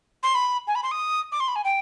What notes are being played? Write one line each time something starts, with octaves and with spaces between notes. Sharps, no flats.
C6
B5
G#5
B5
C6
D#6
D6
C6
B5
G#5
G5